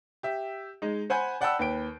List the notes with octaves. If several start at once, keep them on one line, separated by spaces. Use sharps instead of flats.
G4 E5
G#3 D#4
C5 F#5 G#5 B5 G6
D5 F#5 G5 A5 B5 E6
D#2 B4 G5 D7